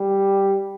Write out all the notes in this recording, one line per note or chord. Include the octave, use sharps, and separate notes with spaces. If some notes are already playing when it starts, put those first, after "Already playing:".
Already playing: G3